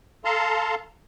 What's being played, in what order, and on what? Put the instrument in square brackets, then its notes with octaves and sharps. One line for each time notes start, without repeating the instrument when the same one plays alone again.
[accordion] A4 F5 A5 A#5 C6